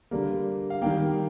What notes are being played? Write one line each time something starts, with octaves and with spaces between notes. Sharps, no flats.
D3 G3 A#3
F5
D#3 G3 A#3 G5